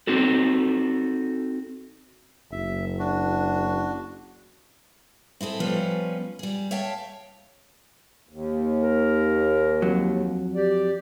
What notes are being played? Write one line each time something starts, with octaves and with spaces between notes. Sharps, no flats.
C4 D#4 F#4 A4
F#1 E5
D4 F#4
C4 E4 G#4 A4
F3 G3 B3 C#4 F4 B4
G3 G#4
C#5 E5 F5 G5 A5
D#2
A#4
F2 F#3
G4 D5